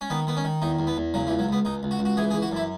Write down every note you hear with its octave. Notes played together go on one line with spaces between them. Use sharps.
C#4
D#3 B3
D#3 B3
C#4
D#3
E2 D#4
E2
B3
E2
C#3 F#3
E3
C#2
F#3
C#2 B3
C#2 D#4
C#2
F#4
C#2
F#4
E3 G#4
G#4
E3
F#4
F#2 E4